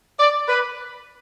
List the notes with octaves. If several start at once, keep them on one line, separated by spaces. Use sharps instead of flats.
D5
B4